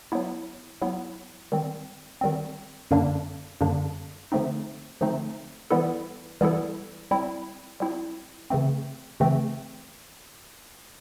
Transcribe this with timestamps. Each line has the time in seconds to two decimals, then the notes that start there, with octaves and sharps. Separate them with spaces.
0.12 F#3 B3 E4
0.82 F#3 B3 E4
1.52 D#3 G3 C4
2.21 D#3 G3 C4
2.91 F#2 D3 G3 A#3 D4
3.61 F#2 D3 G3 A#3 D4
4.32 D3 F3 A3 C4 D#4
5.01 D3 F3 A3 C4 D#4
5.71 E3 G3 B3 E4 A4
6.41 E3 G3 B3 E4 A4
7.11 G3 C4 E4
7.80 G3 C4 E4
8.50 C#3 E3 A3 C4
9.20 C#3 E3 A3 C4